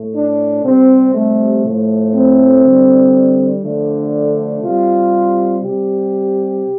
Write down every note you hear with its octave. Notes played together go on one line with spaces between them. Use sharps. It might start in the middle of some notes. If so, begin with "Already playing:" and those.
Already playing: A2 A3
D4
C3 G3 C4
A3
A2 F3 A3
C4
D3 G3
D3 F3 A3 D4
C3 G3 F4
C3 G3 G4